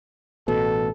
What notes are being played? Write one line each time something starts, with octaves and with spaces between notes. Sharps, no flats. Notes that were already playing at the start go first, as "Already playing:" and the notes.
A1 B2 A4